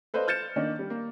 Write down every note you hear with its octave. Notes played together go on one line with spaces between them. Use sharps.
A4 B4 C5 D5 D#5 F5
F6 G6 A6 C#7 E7
D#3 A#3 D4 D#4 D#5
G3
A#3